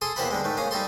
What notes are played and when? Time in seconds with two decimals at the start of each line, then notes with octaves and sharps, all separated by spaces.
0.01 G#4 A4 C6 D#6
0.16 E2 A#3 G4 C5 F#5 B5
0.31 D3 G3 G#3
0.44 G#2 D#3 A3
0.57 A#3 C#4 F5 D#6
0.71 G3 D#4 A4 C6